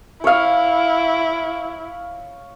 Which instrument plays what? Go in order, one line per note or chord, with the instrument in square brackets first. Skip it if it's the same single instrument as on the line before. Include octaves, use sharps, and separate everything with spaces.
[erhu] E4 [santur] C#5 F5